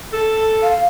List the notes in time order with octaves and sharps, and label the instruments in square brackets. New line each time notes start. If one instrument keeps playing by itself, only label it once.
[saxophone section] A4
[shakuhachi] F5